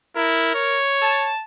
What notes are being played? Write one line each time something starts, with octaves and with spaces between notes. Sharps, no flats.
E4 A#4
C#5
A5